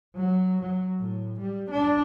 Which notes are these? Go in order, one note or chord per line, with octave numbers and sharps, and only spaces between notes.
F#3
F#3
A2
G3
D4